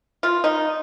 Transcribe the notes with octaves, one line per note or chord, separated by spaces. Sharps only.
F4
D#4